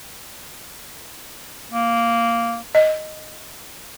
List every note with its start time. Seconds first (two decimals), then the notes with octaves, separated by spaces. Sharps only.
1.71 A#3
2.75 D#5